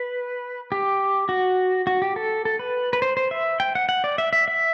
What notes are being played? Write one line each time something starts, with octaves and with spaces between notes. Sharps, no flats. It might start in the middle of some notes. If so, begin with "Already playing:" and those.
Already playing: B4
G4
F#4
F#4
G4
A4
A4
B4
B4
C5
C5
E5
G5
F#5
F#5
D5
E5
E5
E5